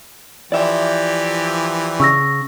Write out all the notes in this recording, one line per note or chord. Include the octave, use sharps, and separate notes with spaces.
E3 F3 G4 D5 E5
C#3 C#6 E6 A#6